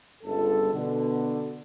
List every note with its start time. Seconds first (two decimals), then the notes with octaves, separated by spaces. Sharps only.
0.23 G1 C#2 G2 A4
0.73 B2 D3